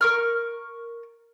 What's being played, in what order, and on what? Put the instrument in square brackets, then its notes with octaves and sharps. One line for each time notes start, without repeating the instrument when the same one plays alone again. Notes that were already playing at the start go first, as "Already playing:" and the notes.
[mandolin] A#4 C#6 F6